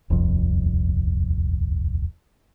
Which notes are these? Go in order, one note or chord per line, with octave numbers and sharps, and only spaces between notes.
D#1 C2 F2